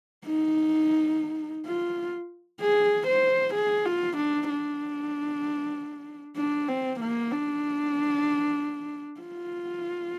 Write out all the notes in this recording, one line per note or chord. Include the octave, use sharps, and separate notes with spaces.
D#4
F4
G#4
C5
G#4
F4
D4
D4
D4
C4
A#3
D4
F4